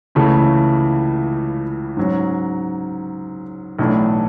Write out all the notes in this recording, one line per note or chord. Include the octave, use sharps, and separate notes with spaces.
C#2 C#3 E3 A3 C#4
G#2 F#3 C#4
B1 A2 E3 A3 D4